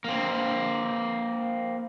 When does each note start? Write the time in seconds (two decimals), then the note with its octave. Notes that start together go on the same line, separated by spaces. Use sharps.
0.04 A#3 C4